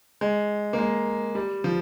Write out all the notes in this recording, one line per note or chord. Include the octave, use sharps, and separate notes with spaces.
G#3
A#3
G#3
G3
F3